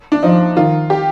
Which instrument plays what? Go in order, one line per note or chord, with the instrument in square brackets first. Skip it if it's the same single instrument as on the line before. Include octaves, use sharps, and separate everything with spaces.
[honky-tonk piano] D4
[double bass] F3 [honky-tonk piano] D#4
[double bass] D#3 [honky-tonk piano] F4
[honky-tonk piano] G4